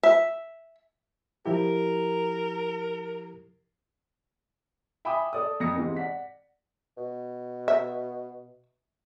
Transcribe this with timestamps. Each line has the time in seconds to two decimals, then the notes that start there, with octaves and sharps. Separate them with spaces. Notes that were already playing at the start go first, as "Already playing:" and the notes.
0.03 E5
1.46 F3 E4 G4 A#4
5.05 E5 G5 G#5 B5 D6 D#6
5.33 A4 D5 D#6
5.60 F2 D#6 A#6 C#7
5.76 G#2 C3 E3
5.96 D5 F#5 B6
6.97 B2
7.68 E5